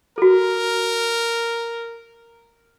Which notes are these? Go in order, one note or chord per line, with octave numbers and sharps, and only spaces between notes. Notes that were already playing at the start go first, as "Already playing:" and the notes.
F#4 A4 A#4